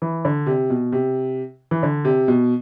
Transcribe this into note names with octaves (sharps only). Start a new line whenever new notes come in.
E3
D3
C3
B2
C3
E3
D3
C3
B2